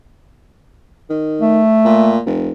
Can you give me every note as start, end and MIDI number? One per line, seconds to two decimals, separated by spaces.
1.10 1.60 51
1.42 2.19 57
1.85 2.20 46
2.26 2.52 29